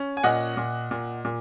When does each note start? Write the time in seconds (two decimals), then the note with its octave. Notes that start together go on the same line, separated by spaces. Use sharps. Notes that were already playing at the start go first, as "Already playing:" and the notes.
Already playing: C#4
0.17 G#5
0.23 A#2 D#5 F#5
0.57 A#2
0.91 A#2
1.25 A#2